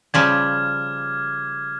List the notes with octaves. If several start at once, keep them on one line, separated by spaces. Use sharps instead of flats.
C#3 F3 G3 D6 F6 G#6